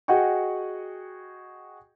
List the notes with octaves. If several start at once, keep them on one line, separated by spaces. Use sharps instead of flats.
F#4 G#4 D#5 F#5 G5 C#6